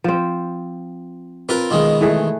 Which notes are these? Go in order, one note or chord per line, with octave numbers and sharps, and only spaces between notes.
F3 C4
C4 F4 A#4 B4
B2 D#3 G#3 F4
E3 A3 G#4